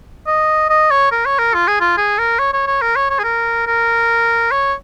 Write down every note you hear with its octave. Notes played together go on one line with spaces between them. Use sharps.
D#5
D#5
C#5
A#4
C#5
A#4
F4
G#4
F4
G#4
A#4
C#5
C#5
C#5
A#4
C#5
C#5
G#4
A#4
A#4
C#5